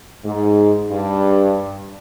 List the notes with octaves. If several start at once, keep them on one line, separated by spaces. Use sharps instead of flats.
G#2
G2